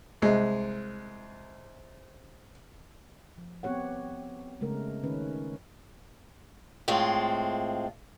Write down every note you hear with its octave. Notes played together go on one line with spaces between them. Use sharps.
C2 G#3
F3
B3 C4 G4 C#5 F#5
C#3 G#3 A3 A#4
D#3 C#4 B4
A2 G#3 C4 F4